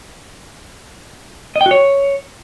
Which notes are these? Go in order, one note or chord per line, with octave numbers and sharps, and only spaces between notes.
D#5
G5
F#4
C#5